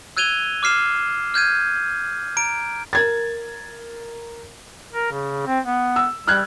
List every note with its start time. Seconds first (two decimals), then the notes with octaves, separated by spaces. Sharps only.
0.17 E6 F#6 G#6 D#7 F7 G7
0.63 D6 F6 C7 E7
1.34 F6 G6 G#6 D#7
2.37 A#5 D7
2.93 A#4 G#6 A6
4.93 A#4
5.11 C#3
5.46 C4
5.65 B3
5.96 E6
6.27 G3 F6 F#6 G#6